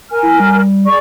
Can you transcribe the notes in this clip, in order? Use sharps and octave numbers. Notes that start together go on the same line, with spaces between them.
A#4 G#5 F6
E4
G3
G#4 D5 C#6